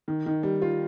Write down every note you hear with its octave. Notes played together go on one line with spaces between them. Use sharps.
D#3
D#3
G3
F4